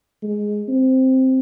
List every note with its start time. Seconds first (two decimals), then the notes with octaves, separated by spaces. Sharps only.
0.23 G#3
0.69 C4